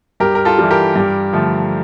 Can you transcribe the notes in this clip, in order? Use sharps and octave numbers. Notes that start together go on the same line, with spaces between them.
G2 G4 A#4
A#4
F4 A4
E3 G3
G4 A#4
G2
D3 F3 A3